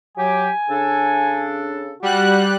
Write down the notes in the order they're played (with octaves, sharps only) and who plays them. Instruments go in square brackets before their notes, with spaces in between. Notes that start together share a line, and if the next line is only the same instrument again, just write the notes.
[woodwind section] F#3 G4 [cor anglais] G#5
[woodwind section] C#3 D4 A4
[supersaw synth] G3 F#6 [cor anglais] F#4